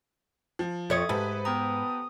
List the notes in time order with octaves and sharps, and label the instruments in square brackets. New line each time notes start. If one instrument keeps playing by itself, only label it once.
[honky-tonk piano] F3
[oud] F2 C#5 [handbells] E5 D#6 G#6
[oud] G#2 [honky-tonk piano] G4 A4 B4
[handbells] B3 G5 A#5 [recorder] D#6